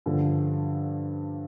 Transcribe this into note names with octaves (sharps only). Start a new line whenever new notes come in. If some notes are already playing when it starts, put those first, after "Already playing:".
G2 D3 F3